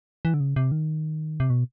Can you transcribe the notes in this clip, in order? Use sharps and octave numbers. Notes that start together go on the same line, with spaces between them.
E3
D3
C#3
C3
D#3
C3
B2